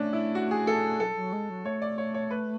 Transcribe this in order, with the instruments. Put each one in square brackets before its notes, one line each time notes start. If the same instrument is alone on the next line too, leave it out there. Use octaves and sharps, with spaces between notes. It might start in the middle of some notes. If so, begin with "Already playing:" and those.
Already playing: [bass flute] A3 [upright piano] C#4 D4
[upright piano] E4
F#4
G#4
A4
[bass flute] F#3 [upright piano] A4
[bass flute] F#3
G#3
F#3
[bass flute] A3 [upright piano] C#5
[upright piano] D5
C#5
C#5
B4